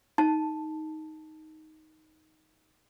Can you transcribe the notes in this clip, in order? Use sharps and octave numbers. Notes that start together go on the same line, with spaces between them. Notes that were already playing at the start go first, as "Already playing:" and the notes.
D#4 A5